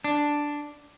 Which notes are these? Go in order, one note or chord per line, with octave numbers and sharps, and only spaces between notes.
D4